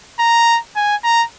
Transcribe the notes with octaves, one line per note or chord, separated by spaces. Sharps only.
A#5
G#5
A#5